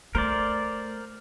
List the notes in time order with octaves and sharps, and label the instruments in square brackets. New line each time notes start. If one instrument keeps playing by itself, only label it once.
[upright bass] A3 [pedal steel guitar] A#4 C5 D5